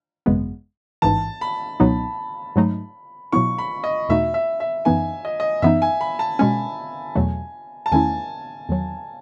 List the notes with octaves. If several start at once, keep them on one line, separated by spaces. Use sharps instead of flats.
G#1 F#2 C#3 G#3 B3
A1 G#2 E3 A5
B5
C#2 B2 F#3 B3 D#4
G#2 F#3 A3 D#4
B2 F#3 B3 E4 C#6
B5
D#5
E2 B2 A3 D#4 F#4 E5
E5
E5
F#2 E3 B3 D#4 G#5
D#5
D#5
F#2 E3 B3 D#4 E5
G#5
B5
A5
B2 G#3 C#4 G#5
E2 B2 F#3 A3
A5
E2 D#3 A3 C#4 E4 G#5
E2 D#3 F#3